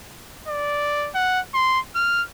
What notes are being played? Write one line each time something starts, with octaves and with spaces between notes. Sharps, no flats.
D5
F#5
C6
F6